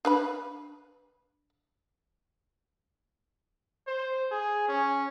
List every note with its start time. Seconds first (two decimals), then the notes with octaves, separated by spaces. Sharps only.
0.05 D4 B4 B5
3.87 C5
4.32 G#4
4.68 C#4